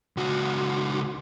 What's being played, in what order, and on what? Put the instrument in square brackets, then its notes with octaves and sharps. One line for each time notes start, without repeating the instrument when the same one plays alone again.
[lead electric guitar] C#2 F#4